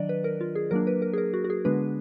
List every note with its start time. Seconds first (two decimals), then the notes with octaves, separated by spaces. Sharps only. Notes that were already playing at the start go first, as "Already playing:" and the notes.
Already playing: D#3 F#3 D4 D5 D#5
0.09 B4
0.24 A#4
0.41 F4
0.55 G#4
0.71 F#3 A#3 D4 A#4
0.87 B4
1.02 A#4
1.13 G#4
1.18 A#4
1.34 F#4
1.44 F#4
1.50 G#4
1.65 D3 G#3 B3 D4 B4